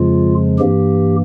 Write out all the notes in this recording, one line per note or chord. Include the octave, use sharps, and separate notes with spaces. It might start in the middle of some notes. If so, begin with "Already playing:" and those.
Already playing: F2 C#3 F3 G#3 F4
G2 E3 A#3 G4